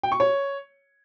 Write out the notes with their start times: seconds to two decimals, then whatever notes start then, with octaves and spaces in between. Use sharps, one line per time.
0.03 G5
0.12 C#6
0.20 C#5